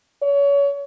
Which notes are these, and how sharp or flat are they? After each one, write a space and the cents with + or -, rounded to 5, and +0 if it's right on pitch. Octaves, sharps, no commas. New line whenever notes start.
C#5 +30